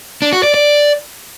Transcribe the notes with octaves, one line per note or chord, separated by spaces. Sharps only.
D4
F#4
D5
D5